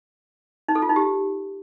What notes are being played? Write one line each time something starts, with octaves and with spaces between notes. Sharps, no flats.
D#4
A4
F4
D#4
G4